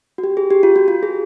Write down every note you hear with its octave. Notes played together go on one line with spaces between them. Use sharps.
F#4
G4
G#4
G4
F4
F#4
F4
G#4